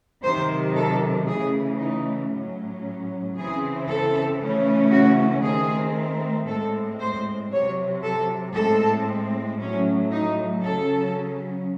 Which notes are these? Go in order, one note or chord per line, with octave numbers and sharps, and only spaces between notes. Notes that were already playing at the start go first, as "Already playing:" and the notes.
C3 D#3 F#3 C5
A4
C#3 E3 A3 G#4
D#4
A2 F#3 C#4
C#3 E3 C4 G#4
A4
C#3 E3 A3 C#4
F#4
D#3 A3 C4 G#4
A2 G#3 C4 A4
C5
C3 F#3 C4 C#5
A4
A2 G#3 C4 A4
A2 F#3 A3 C#4
D#4
C#3 F#3 C#4 A4